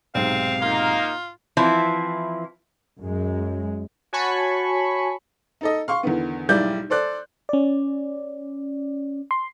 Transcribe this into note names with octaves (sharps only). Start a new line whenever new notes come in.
B1 G#2 C3 C4 F5
A#3 D#4 F4
E3 F3 C4 E4
F#2 G#3
F#4 C#5 G#5 A5 B5 C#6
D#4 A4 D#5
F5 C6 C#6
E2 D3 D#3 B3
B1 G#2 G3 E4 D5 G6
A4 C5 D5 F#6
C#4 D5
C6